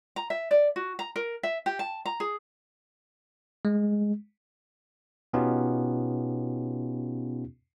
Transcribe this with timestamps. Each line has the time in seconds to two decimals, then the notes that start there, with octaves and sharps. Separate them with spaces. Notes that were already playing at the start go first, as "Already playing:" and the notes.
0.16 A#5
0.30 E5
0.51 D5
0.76 F#4
0.99 A#5
1.16 A#4
1.43 E5
1.66 G4
1.79 A5
2.06 A#5
2.20 G#4
3.65 G#3
5.33 B2 B3 C#4 D#4 F4 G4